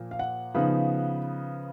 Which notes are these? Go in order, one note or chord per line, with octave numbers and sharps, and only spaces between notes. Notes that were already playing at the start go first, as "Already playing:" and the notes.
Already playing: A#2 F3 A#3
F5
F#5
C#3 F3 B3 D#4